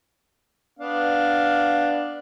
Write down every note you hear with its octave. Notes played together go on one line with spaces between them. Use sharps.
B3 D4 F5